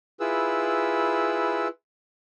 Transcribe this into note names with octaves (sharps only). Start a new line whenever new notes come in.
E4 F4 G#4 B4 E6